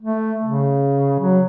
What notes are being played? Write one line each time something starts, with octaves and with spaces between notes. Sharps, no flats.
A3
C#3
F#3